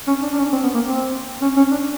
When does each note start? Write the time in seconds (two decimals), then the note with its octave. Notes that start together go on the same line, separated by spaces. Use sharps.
0.07 C#4
0.22 D4
0.33 D4
0.37 C#4
0.53 C4
0.63 B3
0.74 A#3
0.86 C4
1.42 C#4
1.57 C#4
1.71 D4